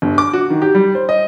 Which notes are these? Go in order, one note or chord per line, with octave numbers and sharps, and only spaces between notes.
G1
D6
F#4
D#3
G4
G3
C5
D#5